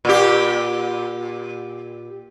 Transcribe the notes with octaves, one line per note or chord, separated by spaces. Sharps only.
A#2 G4